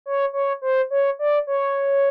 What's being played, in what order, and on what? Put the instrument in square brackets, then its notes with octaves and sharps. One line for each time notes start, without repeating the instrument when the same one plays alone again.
[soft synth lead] C#5
C#5
C5
C#5
D5
C#5